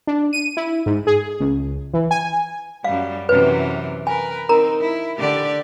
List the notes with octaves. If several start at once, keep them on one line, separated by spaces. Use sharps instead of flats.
D4
D#7
E4
G#2
G#4
C#2
E3
G#5
F#2 G3 F5
F#2 C3 E3 B4
A#4 B4 G#5
C4 D#4 A#4 A#5
E4
D3 G4 D5